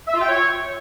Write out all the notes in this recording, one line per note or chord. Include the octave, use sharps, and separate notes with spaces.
E5
F4
G5
C#5